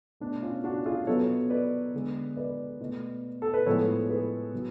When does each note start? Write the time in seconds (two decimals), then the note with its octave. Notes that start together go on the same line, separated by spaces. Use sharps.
0.20 B2 A3 D4
0.42 C#4 F4
0.64 D4 F#4
0.86 F4 G#4
1.07 B2 F#3 B3 A4 C#5
1.50 B4 D5
1.94 D3 G#3 B3
2.37 B4 D5
2.81 B2 A3
3.42 A4
3.54 B4
3.66 A2 F3 G#3 B3 A4 C#5
4.10 G#4 B4
4.52 B2 F#3